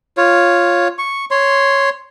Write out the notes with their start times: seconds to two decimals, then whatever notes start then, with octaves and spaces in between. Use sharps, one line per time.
0.17 F4 C#5
0.98 C#6
1.31 C#5 C6